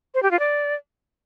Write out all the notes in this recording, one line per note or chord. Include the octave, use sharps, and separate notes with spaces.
C5
G4
F4
D5